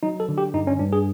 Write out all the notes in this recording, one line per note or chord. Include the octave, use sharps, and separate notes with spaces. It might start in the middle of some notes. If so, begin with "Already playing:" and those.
F#3 D#4
A4
D3
G4
G2 D#4
C#4
G2 D4
G#4